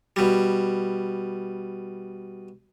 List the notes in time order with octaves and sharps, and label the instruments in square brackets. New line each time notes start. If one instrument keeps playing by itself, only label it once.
[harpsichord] B2 G3